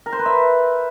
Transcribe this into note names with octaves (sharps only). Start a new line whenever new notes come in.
A#4
C5
B4
E5